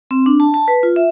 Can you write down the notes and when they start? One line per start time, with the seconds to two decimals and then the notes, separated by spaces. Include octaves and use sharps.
0.11 C4
0.26 D4
0.40 A5
0.54 A5
0.68 B4
0.83 F4
0.96 E5